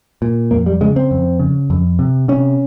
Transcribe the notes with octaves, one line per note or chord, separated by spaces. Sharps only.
A#2
F2 A#3
G3
C#3 G#3
C4
F2
C#3
F2
C3
C3 C#4